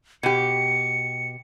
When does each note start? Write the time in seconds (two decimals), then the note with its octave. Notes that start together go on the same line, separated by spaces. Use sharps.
0.23 B2 G4 C#7